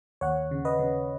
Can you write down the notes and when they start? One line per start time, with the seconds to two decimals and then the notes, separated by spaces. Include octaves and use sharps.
0.21 D#2 C#5 F#5
0.51 C#3
0.65 B4 D#5
0.79 C#3